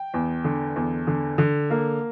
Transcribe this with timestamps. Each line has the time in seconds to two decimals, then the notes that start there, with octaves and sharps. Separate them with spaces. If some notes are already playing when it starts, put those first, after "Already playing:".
Already playing: G5
0.14 E2
0.44 D3
0.76 E2
1.07 D3
1.38 D3
1.70 A#3